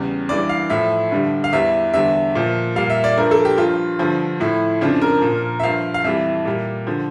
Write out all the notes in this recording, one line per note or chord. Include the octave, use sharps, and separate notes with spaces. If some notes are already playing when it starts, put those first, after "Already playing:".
Already playing: E2 C#3 G3
G2 E3 G3 D5
F5
A2 F3 E5
G2 D3 G3
F5
E2 E3 G3 E5
E2 D3 G3 E5
A#2 F3
A#2 G3 F5
E5
D5
G2 F3 A#4
A4
G4
G2 F3 F4
G2 D3 F3
A2 F3 E4
F2 C#3 F3 D4
A#4
A#2
F3
E5
G2 F3 F5
F5
F2 E3 G3 E5
A#2 G3
D3 F3